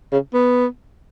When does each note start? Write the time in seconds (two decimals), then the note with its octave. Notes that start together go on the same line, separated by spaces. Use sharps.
0.12 C#3
0.34 B3